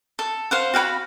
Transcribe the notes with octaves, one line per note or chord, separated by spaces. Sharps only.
A4
C5 F5 F#5
F#4 F5 G5 B5